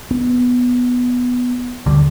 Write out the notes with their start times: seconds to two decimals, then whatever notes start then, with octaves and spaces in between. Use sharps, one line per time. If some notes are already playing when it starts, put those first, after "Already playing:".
0.11 B3
1.86 D2 D3 G3